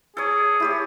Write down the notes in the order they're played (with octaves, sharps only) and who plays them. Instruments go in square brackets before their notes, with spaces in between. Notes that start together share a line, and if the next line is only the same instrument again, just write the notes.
[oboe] G#4 [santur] A4 C#5
[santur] E4 G4 C#5